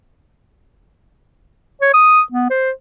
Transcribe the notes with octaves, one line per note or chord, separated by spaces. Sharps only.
C#5
D#6
B3
C5